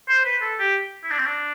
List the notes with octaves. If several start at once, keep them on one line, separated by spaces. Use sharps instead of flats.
C5
B4
A4
G4
E4
D4
C4
D4